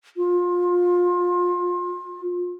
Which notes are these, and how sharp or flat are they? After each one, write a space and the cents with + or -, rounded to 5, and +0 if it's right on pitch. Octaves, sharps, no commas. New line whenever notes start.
F4 +25